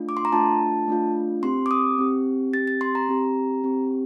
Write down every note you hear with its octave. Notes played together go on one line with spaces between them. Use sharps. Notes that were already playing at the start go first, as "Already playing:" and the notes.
Already playing: A3 D4 F4
D6
C6
A#5
A3 D4 F4 A5
A3 D4 F4
C4 G4 C6
D6
D#6
C4 G4
C4 G4 A6
A6
C6
A#5
C4 G4
C4 G4